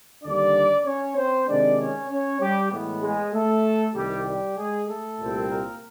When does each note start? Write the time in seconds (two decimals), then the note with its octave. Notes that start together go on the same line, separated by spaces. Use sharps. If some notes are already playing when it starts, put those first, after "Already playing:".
0.24 D#2 D3 G3 D4 D5
0.86 C#4 C#5
1.17 C4 C5
1.48 C3 D#3 G#3 D4 D5
1.78 C#4 C#5
2.10 C#4 C#5
2.41 G3 G4
2.71 A2 E3 G#3 B3
3.02 G#3 G#4
3.33 A3 A4
3.95 C2 C3 D#3 G3 G4
4.26 G3 G4
4.57 G#3 G#4
4.88 A3 A4
5.19 C2 A#2 G3 C4
5.50 A#3 A#4